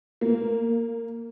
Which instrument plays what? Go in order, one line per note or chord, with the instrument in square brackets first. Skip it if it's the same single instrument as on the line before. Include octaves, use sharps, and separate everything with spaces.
[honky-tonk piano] A#3